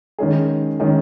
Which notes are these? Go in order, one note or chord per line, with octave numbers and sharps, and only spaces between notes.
D#3 G#3 C#4 G#4
D#3 G#3 C#4 G#4